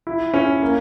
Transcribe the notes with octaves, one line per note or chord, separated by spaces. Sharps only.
E4
C#4
A#3